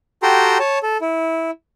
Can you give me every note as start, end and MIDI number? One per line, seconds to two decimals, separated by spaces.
0.23 0.58 66
0.23 0.58 67
0.23 0.58 69
0.23 0.58 79
0.23 0.58 82
0.23 0.58 84
0.59 0.79 73
0.59 0.79 81
0.83 0.97 69
1.01 1.51 64